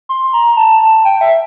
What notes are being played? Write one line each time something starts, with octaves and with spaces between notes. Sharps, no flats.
C6
A#5
A5
G5
E5